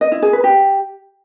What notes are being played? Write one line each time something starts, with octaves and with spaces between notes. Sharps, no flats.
D#5
E4
G#4
B4
G4